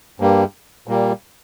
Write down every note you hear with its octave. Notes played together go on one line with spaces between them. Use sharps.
G2 G3 A#3
A#2 G3 A#3